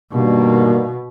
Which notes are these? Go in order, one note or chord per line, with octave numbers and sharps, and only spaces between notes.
G2 B2 D#3 A#3